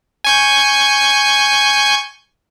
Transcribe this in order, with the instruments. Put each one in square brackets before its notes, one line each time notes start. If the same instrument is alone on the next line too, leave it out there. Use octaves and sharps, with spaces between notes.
[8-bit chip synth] G#5 C#6 G6